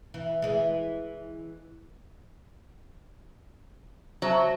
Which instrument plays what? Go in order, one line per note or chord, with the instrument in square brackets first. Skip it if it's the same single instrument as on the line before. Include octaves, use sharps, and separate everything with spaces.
[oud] E3
E3 G#3
[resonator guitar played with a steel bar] F#3 [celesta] C5 E5 A5